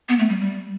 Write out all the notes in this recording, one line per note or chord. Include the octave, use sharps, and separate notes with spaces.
B3
A3
G3
G3